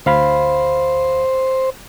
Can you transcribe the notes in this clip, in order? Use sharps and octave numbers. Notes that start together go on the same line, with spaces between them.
D2 C5 F5 B5